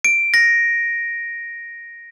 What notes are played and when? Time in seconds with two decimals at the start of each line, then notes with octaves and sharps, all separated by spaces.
0.04 D7
0.34 A#6